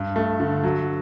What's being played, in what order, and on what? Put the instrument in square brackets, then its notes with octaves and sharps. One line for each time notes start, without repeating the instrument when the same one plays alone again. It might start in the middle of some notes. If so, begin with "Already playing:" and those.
Already playing: [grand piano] G2
A3
D3
F#3